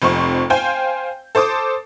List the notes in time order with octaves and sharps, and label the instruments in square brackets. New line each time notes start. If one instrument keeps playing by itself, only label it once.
[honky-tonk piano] F1 F2 C5 C#6
C5 F5 G5 G#5 G6
A4 C5 A5 D6 D#6